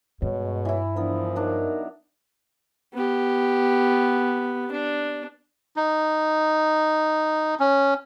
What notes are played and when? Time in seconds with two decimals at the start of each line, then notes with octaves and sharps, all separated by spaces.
0.22 G2 B2 G#3 C#5
0.65 E3 E4
0.96 E3 F3 B3 D4 A#4
1.36 F#3 D4 D#4 A#4
2.94 B3 G4
4.72 D4
5.76 D#4
7.60 C#4